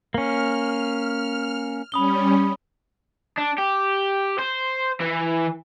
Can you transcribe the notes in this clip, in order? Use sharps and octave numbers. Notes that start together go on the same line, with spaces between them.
A#3 C#4 F6
G3 C#4 B5 D#6 G7
D4
G4
C5
E3